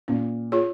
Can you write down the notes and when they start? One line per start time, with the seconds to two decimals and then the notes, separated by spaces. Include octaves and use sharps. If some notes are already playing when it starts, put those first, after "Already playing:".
0.08 A#2 C#4
0.52 F4 G#4 C#5